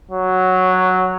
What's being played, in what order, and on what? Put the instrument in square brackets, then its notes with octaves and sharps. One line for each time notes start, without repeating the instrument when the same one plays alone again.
[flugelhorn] F#3